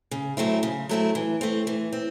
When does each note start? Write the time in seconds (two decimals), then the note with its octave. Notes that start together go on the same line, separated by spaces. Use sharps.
0.11 C#3
0.37 F#3 A3 C4 E4
0.63 C#3
0.89 F#3 A3 C4 E4
1.15 E3
1.41 A3 C4
1.67 E3
1.93 C4